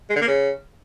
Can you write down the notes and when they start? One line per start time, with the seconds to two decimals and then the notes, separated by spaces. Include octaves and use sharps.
0.10 G#3
0.16 D3
0.22 A#3
0.28 C#3